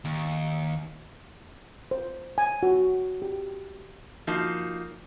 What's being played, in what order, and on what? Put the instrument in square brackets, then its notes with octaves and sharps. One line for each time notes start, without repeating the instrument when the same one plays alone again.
[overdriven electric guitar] D#2
[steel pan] C5
G#5
F#4
G4
[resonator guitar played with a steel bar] F3 A#3 D#4 F#4